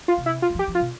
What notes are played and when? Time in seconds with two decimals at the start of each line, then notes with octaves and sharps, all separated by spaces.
0.08 F4
0.18 C3
0.26 E4
0.42 F4
0.50 F#3
0.55 F3
0.59 G4
0.68 F3
0.75 F4
0.80 B2